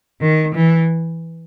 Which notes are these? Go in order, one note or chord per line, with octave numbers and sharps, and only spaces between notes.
D#3
E3